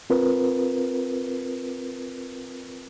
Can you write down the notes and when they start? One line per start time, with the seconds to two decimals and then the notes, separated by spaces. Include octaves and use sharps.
0.10 C4 F4 A#4 B4